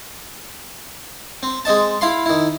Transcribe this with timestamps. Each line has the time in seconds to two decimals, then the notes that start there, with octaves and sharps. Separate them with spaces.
1.43 C4
1.65 G#3 C4 D#5 A5
2.01 E4 F5 B5 C6
2.26 D#3 E4